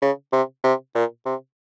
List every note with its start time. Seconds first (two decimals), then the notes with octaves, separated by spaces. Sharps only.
0.02 C#3
0.33 C3
0.64 C3
0.95 A#2
1.26 C3